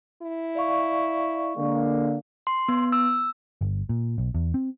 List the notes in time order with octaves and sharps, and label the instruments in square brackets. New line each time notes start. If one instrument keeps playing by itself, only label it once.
[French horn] E4
[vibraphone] D5 F5 C#6
[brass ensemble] D3 A#3 [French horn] G#3
[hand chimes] C6
B3
E6
[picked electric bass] G1
A#2
B1
E2
C4